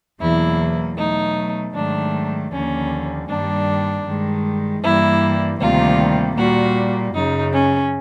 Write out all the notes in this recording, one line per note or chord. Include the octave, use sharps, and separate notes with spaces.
E2 B2 F#3 A#3 E4
B2 F#3 A3 D#4
G#2 D#3 F#3 A3 D4
D#2 D3 F3 A#3 C#4
G2 D#3 G3 A#3 D4
G2 D#3 G#3
G2 E3 G3 A#3 E4
D2 C3 D#3 G3 A#3 F4
A#2 G3 A#3 F#4
F#2 C#3 F#3 D#4
C#4